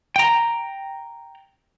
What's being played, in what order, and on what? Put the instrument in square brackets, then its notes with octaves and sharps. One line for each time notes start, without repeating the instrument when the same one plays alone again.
[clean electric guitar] G5 A#5